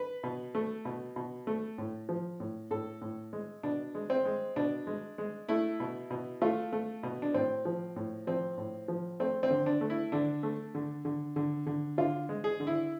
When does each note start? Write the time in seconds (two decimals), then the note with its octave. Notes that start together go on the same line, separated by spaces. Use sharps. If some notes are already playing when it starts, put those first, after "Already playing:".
Already playing: B4
0.24 B2
0.55 A3
0.85 B2
1.16 B2
1.47 A3
1.78 A2
2.09 F3
2.40 A2
2.71 A2 A4
3.01 A2
3.33 G#3
3.63 B2 D4
3.95 G#3
4.10 C4
4.25 G#3
4.56 B2 D4
4.87 G#3
5.18 G#3
5.49 A3 E4
5.80 B2
6.10 B2
6.42 A3 F4
6.73 A3
7.03 B2
7.22 D4
7.34 A2 C4
7.65 F3
7.96 A2
8.27 F3 C4
8.58 A2
8.88 F3
9.20 A3 C4
9.43 C4
9.50 D3
9.66 D4
9.81 A3
9.90 E4
10.12 D3 D4
10.43 A3
10.75 D3
11.05 D3
11.36 D3
11.67 D3
11.98 D3 F4
12.29 G#3
12.44 G#4
12.60 D3
12.67 E4